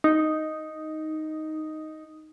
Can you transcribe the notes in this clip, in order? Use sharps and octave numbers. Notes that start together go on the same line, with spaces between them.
D#4